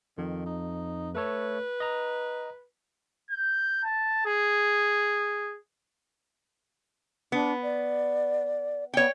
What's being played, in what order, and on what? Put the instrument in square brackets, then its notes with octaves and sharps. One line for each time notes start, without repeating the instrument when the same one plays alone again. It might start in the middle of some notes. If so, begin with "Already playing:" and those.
[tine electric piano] F2 [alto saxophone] D#3
[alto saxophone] D#4
[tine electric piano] A3 A4 C#5 [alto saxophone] B4
[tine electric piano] D#5 A#5
[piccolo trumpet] G6
A5
G#4
[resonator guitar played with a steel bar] B3 [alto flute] D4
[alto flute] D5
[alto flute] B3 [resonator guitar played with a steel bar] C#5 G5